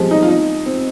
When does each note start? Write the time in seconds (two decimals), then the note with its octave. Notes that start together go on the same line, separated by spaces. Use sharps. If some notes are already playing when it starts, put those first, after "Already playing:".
Already playing: F3 G3 G#3 C4
0.11 D#4
0.22 F4
0.29 D#4
0.66 C4